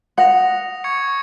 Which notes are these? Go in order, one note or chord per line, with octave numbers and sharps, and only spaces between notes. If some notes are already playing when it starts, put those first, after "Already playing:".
F#5 D#6 A#6 F7
C#6 G#6 C#7